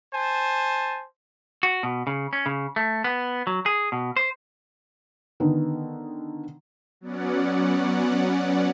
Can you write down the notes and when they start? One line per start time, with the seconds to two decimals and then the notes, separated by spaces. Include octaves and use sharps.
0.14 C5 G#5 A5
1.63 F#4
1.83 B2
2.07 C#3
2.33 C#4
2.46 C#3
2.76 A3
3.04 B3
3.47 F#3
3.66 G#4
3.92 B2
4.17 C5
5.40 D3 D#3 B3 D#4
7.01 F#3 B3 C#4 D5 F#5